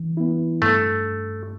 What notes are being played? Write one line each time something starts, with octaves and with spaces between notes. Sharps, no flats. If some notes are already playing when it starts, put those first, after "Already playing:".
Already playing: E3
B3 E4
G2 A3